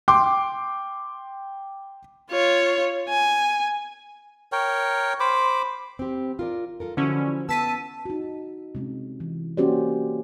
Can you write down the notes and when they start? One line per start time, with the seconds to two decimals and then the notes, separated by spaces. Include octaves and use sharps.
0.08 G5 C6 D6
2.30 F4 C#5
3.09 G#5
4.52 A#4 C#5 G5
5.20 C5 B5 D6
5.99 C4 G4
6.39 F4 A#4 D5
6.80 F4 A4 A#4
6.97 D3 F3 F#3 C#4 E4 C5
7.49 B3 A5 E6 B6 D#7
8.05 D#4 F#4
8.75 C3 G#3 C#4
9.20 E3
9.57 A#3 C#4 F#4 G4 C5 D5